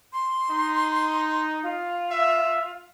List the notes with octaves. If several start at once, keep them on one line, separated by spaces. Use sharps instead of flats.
C6
D#4
F4
E5